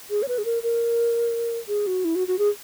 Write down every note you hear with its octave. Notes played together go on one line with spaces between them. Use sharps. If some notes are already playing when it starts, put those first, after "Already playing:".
G#4
C#5
B4
G#4
A#4
A#4
G#4
F#4
E4
F#4
F#4
G#4